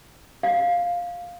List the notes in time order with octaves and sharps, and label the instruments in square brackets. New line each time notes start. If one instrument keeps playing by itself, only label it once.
[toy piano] F5